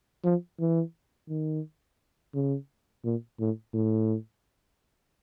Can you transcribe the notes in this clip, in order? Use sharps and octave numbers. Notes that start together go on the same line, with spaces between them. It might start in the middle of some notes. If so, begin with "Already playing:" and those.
F3
E3
D#3
C#3
A#2
A2
A2